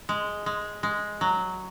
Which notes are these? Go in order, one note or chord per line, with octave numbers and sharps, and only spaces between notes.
G#3
G#3
G#3
F#3